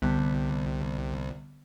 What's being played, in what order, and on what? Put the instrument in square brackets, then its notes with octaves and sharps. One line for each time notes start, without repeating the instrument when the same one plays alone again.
[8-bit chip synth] C2 [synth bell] D3 G3 B3